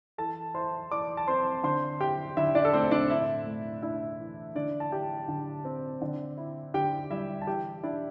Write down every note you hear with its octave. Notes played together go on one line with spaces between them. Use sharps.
E3 A4 A5
E4 C5 C6
E3 D5 D6
A5
C4 C5 C6
D3 C5 C6
E4 G4 G5
D3 E4 E5
D4 D5
A4
A3 C4 C5
D4 D5
A2 E4 E5
A3
D4 E4 E5
E3
D3 D4 D5
A5
E4 G4 G5
D3
C4
D3
E4
D3 G4 G5
G3 E4 E5
A5
E3 G4 G5
D4 E4 D5